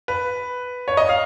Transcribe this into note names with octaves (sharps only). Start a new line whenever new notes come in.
B4
C#5
D#5
F5